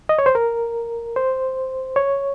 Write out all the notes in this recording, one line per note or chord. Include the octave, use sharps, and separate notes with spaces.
D#5
C#5
C5
A#4
C5
C#5